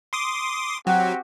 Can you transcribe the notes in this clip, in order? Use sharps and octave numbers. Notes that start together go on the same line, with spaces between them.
C6 D6 D#6
F#3 C4 F#4 G4 F#5